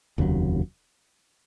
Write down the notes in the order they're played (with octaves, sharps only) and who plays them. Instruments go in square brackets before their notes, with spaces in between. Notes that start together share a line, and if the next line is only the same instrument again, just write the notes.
[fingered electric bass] F1 D#2 C#3 F#3